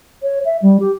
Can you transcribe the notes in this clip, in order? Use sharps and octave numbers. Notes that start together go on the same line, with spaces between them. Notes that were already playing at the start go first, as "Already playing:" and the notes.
C#5
E5
G3
G4